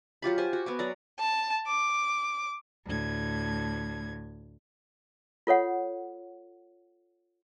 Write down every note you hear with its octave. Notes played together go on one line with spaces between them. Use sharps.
F#3 F4 G4 B5
G4 C5 G#5
F#4
B3 G#5 D6
F#3 D5 A#5
A5
D6
D2 A2 G#6
F4 A4 C#5 F#5